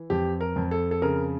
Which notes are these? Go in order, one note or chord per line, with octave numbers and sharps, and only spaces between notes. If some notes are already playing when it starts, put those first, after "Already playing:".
Already playing: E3
F2 G4
A#4
F2
A4
A4
C#3 A#4